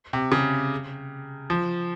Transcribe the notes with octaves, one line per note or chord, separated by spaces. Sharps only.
C3
C#3
F3